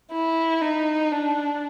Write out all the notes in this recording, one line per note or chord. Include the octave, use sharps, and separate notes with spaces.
E4
D#4
D4